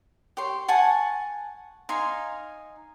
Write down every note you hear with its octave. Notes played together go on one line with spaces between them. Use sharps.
G4 C#5 C6
F#5 G#5 A5 C#6
D#4 F5 G#5 C6